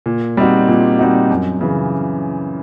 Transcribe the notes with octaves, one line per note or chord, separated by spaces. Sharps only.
A#2
G3 C4 D#4 F#4
A#2
G3 C4 D#4 F#4
F#2
C#3 E3